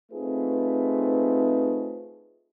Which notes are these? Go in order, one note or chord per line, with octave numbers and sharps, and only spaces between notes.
A3 C4 D#4 F4 G#4 B4